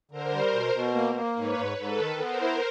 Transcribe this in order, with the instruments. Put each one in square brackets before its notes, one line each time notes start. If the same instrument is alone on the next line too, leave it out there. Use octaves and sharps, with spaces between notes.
[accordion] D3 [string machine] A#4 C5
[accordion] G3
B2
B2
A#3
A#3
[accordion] G#2 [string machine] B4 C#5
[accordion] G#2
[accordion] G#2 [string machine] A4 B4
[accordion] D#3
[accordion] B3 [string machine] A#4 C5
[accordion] E4